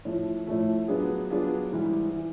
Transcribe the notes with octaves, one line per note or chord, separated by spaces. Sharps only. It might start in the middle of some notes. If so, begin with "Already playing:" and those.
A2 F3 A3
A2 F3 A3
F#3 B3 D4 F4 G#4
F#3 B3 D4 F4 G#4
G#2 E3 G3
E3